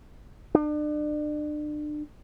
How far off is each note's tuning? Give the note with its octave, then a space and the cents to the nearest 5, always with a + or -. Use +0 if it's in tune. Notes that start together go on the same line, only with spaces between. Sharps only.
D4 +35